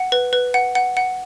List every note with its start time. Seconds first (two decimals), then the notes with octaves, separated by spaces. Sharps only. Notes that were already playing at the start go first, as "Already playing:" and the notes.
Already playing: F#5
0.12 B4
0.33 B4
0.54 F#5
0.75 F#5
0.97 F#5